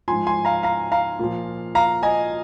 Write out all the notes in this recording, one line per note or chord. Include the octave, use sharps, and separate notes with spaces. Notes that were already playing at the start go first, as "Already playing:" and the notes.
G#2 F3 G#5 C6
G#5 C6
F5 A#5
F5 A#5
F5 A#5
A#2 F3
F5 A#5
D#5 G#5